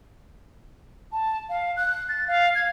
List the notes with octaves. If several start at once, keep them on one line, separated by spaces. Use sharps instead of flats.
A5
F5
F#6
A6
F5
G#6